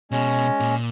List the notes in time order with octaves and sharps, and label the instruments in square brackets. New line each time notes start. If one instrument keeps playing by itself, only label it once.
[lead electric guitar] B2 [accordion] G#3 C#4
[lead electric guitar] A#2